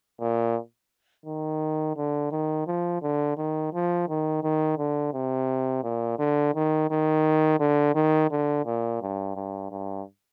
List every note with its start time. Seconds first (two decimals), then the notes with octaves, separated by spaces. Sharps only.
0.20 A#2
1.26 D#3
1.96 D3
2.31 D#3
2.67 F3
3.02 D3
3.37 D#3
3.73 F3
4.08 D#3
4.43 D#3
4.78 D3
5.13 C3
5.83 A#2
6.19 D3
6.55 D#3
6.90 D#3
7.59 D3
7.95 D#3
8.31 D3
8.66 A#2
9.02 G2
9.36 G2
9.71 G2